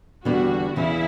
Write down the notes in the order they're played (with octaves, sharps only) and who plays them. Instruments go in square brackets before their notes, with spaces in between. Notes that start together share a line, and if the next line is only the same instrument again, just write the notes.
[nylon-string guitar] E2 D3 G3 B3 [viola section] F#4
[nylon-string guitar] E2 C#3 E3 [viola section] E4